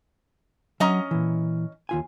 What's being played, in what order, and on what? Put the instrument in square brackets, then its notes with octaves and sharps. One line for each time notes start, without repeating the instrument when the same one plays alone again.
[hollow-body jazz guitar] F#3 [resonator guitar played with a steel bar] C#4 D#5 A#5
[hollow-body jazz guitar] A#2 E3
D#2 F4 G#5